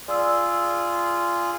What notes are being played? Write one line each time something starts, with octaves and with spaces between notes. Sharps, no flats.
F4 G#4 D5 E6